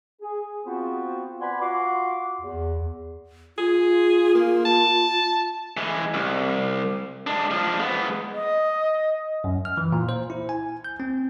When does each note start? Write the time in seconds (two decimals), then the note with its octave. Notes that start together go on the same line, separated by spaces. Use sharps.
0.21 G#4
0.66 B3 C4 F4 F#4 C5
1.41 B4 D5 F#5 G#5 B5 C6
1.61 F4 F#4 F#5 C6 D6
2.41 E2
3.58 F4 G#4
4.35 A#3
4.65 A5
5.77 E3 G#3
6.14 C2
7.27 G#3 D4
7.51 F3 D4
7.80 G#3 B3
8.34 D#5
9.44 F#2
9.65 F6
9.77 E3
9.92 A#2
10.09 C5
10.30 E4
10.49 G#5
10.85 G6
11.00 C4